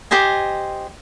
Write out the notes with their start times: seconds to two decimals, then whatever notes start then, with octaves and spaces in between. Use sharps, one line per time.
0.11 G4 C5 D#5 G#5